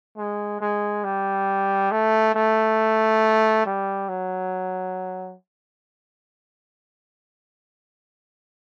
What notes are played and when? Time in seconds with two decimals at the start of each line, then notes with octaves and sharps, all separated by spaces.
0.17 G#3
0.61 G#3
1.04 G3
1.91 A3
2.35 A3
3.65 G3
4.09 F#3